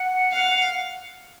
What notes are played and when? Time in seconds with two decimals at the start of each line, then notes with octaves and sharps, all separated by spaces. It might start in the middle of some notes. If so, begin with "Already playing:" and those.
Already playing: F#5
0.32 F5